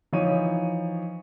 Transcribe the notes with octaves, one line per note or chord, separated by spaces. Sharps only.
E3 F3 D#4 C#5 D#7